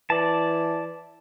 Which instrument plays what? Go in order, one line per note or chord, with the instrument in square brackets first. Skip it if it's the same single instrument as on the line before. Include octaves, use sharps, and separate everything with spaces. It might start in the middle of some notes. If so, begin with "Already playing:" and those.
[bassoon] E3 [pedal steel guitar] D5 A5